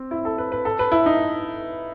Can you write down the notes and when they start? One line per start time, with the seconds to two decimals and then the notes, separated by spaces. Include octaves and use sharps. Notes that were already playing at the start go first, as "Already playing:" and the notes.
Already playing: C4
0.11 E4
0.25 A4
0.38 B4
0.52 B4
0.65 A4
0.79 B4
0.92 E4
1.06 D#4